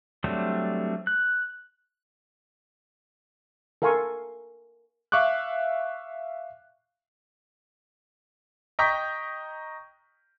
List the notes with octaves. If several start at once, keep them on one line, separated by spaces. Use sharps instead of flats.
F#3 G3 A3 C4 D4
F#6
A4 A#4 F5 G#5 C6 C#6
E5 F5 C#6 D6 F#6
D#5 G5 A#5 C#6 G6 B6